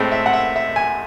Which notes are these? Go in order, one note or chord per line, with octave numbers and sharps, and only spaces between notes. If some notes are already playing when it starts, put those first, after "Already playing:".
Already playing: A2 G#3 C4
E5
F#5
E5
E5
G#5